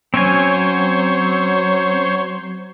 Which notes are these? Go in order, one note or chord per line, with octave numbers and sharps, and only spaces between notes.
F#3 C4 C#4 C5 C#5 G#5